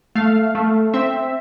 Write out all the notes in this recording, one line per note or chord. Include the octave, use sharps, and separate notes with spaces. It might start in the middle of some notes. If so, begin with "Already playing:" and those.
A3 F5
A3
C4 E5